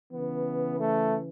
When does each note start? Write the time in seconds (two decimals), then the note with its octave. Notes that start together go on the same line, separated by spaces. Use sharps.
0.12 C#3 E3 B3
0.80 A3